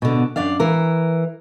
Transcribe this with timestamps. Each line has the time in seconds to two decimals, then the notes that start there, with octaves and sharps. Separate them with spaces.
0.02 B2 D3
0.36 F#2 D4 D5 F5
0.60 E3 A#4